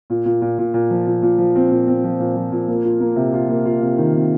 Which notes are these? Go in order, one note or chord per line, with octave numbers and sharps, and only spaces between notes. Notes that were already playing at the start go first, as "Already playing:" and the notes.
A#2
A#2
A#2
A#2
A#2
F3
A#2
A#2
F3
C4
A#2
C4
F3
A#2
F3
A#2
A#3
F4
A#3
C3
F4
A#3
F4
C3
D#3
C3